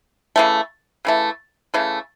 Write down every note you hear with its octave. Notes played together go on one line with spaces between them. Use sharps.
C#3 E3 A3
C#3 E3 A3
C#3 E3 A3